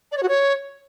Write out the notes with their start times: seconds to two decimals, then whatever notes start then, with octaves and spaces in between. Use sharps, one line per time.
0.12 D5
0.17 C#5
0.23 F#4
0.28 C#5